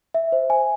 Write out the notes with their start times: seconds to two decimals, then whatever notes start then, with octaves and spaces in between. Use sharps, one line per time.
0.14 E5
0.32 C5
0.50 G#5